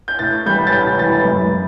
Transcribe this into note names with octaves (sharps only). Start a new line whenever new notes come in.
G6
A2 A6
E3 G3 G6
A6
A2 G6
E3 G3 A6
F#2
E3